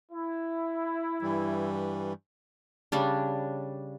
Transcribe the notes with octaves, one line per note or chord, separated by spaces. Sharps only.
E4
G2 E3 G3
C#3 G3 D4